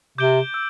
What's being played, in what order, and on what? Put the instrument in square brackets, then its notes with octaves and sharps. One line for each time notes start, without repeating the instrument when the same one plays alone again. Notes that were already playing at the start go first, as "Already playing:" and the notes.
[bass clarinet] C3 [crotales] D6 G6 D7 G7
[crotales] E6